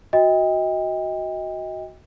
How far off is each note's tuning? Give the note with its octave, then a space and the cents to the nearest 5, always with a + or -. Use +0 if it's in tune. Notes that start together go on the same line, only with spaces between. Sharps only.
F#4 +0 D#5 +30 G5 +30